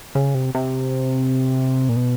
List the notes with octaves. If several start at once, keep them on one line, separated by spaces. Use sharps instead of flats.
C#3
C3
C3
A#2
B2